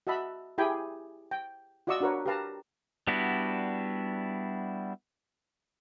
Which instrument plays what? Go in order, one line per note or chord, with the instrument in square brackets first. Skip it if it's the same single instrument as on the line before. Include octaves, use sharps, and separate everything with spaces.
[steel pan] F#4 D#5 E5 A5 B5
E4 G4 G#4 G5 G#5 B5
G5
F4 F#4 D5 D#5 C#6 E6
D4 F#4 A#4 B4 C#5
G4 A#4 B4 F5 A5 A#5
[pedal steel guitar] G3 B3 D4 E4 F#4